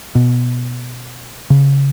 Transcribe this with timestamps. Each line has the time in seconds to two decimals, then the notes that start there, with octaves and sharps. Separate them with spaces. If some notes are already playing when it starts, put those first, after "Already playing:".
0.15 B2
1.50 C#3